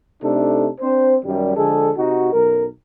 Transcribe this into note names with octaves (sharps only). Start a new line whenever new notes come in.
C3 A3 D4 D#4 A4
C4 D4 C5
F#2 D#3 G3
D3 F3 G#3 G#4 A4
C3 D#4 F#4
B1 F#2 A#4